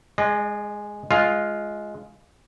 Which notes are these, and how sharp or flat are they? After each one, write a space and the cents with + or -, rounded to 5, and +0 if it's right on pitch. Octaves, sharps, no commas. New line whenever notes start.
G#3 +0 D#5 -40
G#3 +15 F4 +0